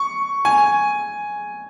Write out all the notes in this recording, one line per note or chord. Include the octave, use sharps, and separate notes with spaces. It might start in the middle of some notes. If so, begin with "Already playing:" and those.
Already playing: C#6
G#5